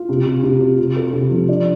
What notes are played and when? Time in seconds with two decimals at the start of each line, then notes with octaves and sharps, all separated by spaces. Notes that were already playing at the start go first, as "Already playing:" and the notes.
Already playing: F4
0.09 C3
0.26 C3
0.43 C3
0.61 F4
0.79 C3
0.96 A4
1.13 C3
1.31 F3
1.49 D4